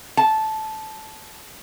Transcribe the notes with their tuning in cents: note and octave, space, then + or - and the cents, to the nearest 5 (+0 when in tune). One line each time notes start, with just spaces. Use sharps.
A5 -10